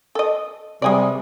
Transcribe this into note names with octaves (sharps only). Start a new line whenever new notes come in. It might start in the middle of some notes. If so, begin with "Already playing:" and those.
A4 D#5
C3 G3 G#3 G#4 D5